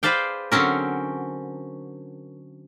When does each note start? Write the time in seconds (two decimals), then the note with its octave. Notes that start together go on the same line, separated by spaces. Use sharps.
0.03 G#4 B4 C5 D5 F5 G5
0.52 D3 F#3 C4 C#4 A#4